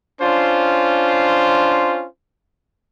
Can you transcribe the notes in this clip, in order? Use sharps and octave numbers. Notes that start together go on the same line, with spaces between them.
C#4 D4 F4 C5